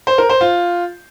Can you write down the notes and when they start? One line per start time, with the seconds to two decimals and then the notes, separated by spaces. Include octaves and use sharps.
0.07 C5
0.18 A#4
0.29 C5
0.41 F4